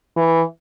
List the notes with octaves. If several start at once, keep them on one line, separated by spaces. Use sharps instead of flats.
E3